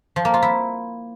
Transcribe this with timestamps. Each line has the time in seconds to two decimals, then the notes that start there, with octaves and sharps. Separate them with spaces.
0.16 F3
0.25 A#3
0.34 F4
0.42 E4